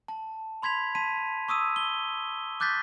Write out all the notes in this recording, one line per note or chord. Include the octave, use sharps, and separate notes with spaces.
A5
B5 C6 G#6 B6 F7
A5 C6 B6 D#7
C#6 D#6 E6 D#7
G7
D6 F#6 G6 A6 B6